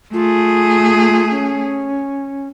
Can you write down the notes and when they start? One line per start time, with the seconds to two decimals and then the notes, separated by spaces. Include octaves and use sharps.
0.13 A3 F4 G#4
1.31 C#4